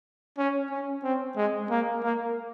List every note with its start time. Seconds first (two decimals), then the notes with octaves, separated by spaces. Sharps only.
0.38 C#4
0.70 C#4
1.03 C4
1.36 G#3
1.70 A#3
2.03 A#3